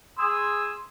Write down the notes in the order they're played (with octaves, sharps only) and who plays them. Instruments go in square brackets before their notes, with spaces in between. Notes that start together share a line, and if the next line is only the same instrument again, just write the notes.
[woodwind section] G#4 E6 [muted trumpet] C6